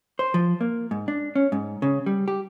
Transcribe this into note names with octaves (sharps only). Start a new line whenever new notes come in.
C5
F3
A#3
G#2
D4
C#4
G#2
C#3
G3
G4